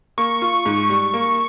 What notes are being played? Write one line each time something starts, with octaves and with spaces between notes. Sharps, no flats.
A#3 C#6
F4
G#2
G3
A#3